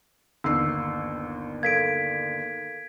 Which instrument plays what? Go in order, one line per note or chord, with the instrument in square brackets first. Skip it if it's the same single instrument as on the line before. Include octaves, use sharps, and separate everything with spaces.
[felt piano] G1 D#2 C7 [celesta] E6
[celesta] A4 A#4 F5 [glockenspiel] G#6 B6 D7